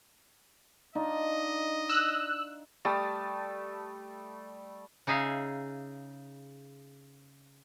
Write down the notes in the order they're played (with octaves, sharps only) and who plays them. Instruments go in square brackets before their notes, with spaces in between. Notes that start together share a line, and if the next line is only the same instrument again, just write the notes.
[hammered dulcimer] D4 D#4 F4 [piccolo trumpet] D#5
[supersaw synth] E6 F#6
[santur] G3 A3 A5 D#6
[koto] C#3 D#4 G#4 E5 F5